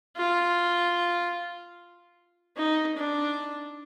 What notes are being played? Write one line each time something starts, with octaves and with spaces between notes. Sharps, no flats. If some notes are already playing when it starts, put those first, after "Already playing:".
F4
D#4
D4